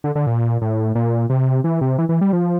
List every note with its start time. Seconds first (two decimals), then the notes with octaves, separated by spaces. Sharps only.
0.04 D3
0.15 D3
0.27 A#2
0.62 A2
0.95 A#2
1.30 C3
1.64 E3
1.81 C3
1.98 E3
2.09 E3
2.21 G3
2.33 F3